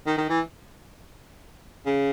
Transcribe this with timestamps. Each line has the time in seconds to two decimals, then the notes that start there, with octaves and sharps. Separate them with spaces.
0.07 D#3
0.18 D#3
0.30 E3
1.86 C#3